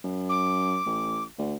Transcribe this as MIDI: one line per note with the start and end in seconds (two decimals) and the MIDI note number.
0.04 0.79 42
0.29 1.23 86
0.86 1.26 33
1.38 1.55 38